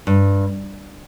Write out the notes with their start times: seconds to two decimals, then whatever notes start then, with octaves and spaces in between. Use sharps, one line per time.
0.07 G2